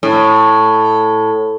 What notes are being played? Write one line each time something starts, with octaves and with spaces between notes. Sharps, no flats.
A2